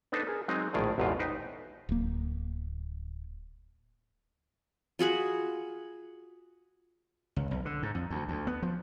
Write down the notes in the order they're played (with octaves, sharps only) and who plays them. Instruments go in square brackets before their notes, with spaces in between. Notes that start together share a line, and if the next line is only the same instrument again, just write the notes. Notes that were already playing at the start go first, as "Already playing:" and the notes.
[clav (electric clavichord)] B3 D4 D#4 A4 B4 C5
G#4 A#4
F#3 G#3 C4 D#4
A#1 A2 D#3 G#4 D5
A1 E2 G#2 B2 F4
D#4 B4 C5 G5
[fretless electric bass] D1 A#3
[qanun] F4 F#4 G#4 B5
[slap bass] C#2
B1
D3
G#2
F2
D2
D2
B3
F3